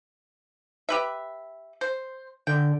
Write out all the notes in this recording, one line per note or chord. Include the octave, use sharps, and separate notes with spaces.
G4 B4 E5
C5
D3 G5